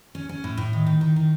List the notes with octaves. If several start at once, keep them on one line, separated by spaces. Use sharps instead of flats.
C#4
C#4
A2
A2
D#3
D#3
D#3
D#3